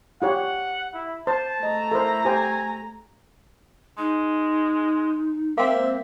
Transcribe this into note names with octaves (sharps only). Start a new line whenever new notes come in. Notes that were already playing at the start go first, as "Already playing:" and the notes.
F4 G4 C#5 F#5
E4
C5 A5
A3 D#5 A#5
E4 A4 A#4 C5
G4 C5 G5 G#5
G#3 D#4
G#3 A#3 C4 E5